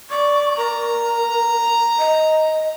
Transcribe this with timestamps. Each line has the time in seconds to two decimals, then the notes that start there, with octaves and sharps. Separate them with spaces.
0.10 D5 C#6
0.57 A#4 A#5
1.99 D#5